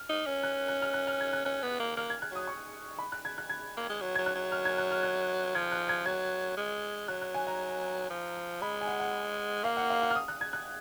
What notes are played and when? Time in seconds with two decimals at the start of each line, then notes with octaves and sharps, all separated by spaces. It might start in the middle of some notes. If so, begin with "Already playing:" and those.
Already playing: F6
0.09 D#4
0.26 C#4
0.43 F#6
0.68 F#6
0.82 F6
0.94 F#6
1.07 F6
1.20 G#6
1.33 F#6
1.45 C#4 F#6
1.63 B3
1.80 A#3
1.96 A#3 F6
2.10 G#6
2.22 F#6
2.31 F#3 D#6
2.47 C#6
2.99 B5
3.12 F#6
3.25 G#6
3.38 F#6
3.49 G#6
3.77 A#3
3.90 G#3
4.02 F#3
4.15 F#3 G#6
4.26 F#6
4.35 F#3
4.52 F6
4.65 G#6
4.78 F#6
4.91 F6
5.03 F#6
5.55 F3 G#6
5.72 F#6
5.89 G#6
6.06 F#3 G#6
6.57 G#3
7.08 F#3 F#6
7.22 F#6
7.34 G#5
7.47 A#5
8.10 F3
8.62 G#3 B5
8.81 G#5
8.87 F#5
9.00 F#5
9.64 A#3 F5
9.77 F#5
9.90 F5
10.02 F#5
10.11 F6
10.15 D#6
10.28 F#6
10.41 G#6
10.53 F#6